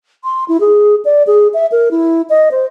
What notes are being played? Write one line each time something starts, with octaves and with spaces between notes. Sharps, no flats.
C6
E4
G#4
D5
G#4
E5
A#4
E4
D#5
C5